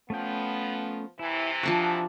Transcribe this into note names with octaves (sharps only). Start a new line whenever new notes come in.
F3 A3 B3 C#4 G5
C3 E3 E4
F3 D4 F#4 D5 F#5